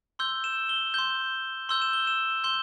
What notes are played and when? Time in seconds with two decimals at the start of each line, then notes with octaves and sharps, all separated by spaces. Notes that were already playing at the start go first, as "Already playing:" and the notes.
0.19 C6 E6 G6 G7
0.44 E7
0.69 G7
0.94 C6 G6 G7
1.69 C6 E6 G6 G7
1.82 E7
1.93 G7
2.07 E7
2.44 C6 G6 G7